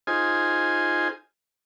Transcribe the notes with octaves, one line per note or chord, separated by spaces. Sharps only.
D#4 F4 G#4 C5 G#5